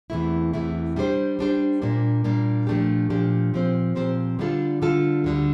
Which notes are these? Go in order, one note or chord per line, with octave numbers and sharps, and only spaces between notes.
E2 C3 E3 A3 E4
E2 C3 E3 A3 E4
G3 D4 G4 C5
G3 D4 G4 C5
A#2 G3 A#3 D4
A#2 G3 A#3 D4
A#2 F3 A3 D4 G4
A#2 F3 A3 D4 G4
A#2 F3 C4 G4 C5
A#2 F3 C4 G4 C5
D3 G3 D4 F4 A4
D3 G3 D4 F4 A4
D2 D3 G3 D4